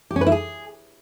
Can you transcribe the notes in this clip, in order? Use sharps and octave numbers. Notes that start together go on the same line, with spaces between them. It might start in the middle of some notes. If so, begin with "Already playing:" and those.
G4
C#4
B4
E4
G#4